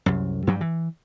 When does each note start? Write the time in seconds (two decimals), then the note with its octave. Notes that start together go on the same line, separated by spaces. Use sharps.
0.06 C2 F#2
0.47 G2 F#3 G3
0.61 E3